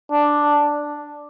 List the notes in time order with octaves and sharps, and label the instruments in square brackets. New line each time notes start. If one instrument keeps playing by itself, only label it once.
[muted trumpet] D4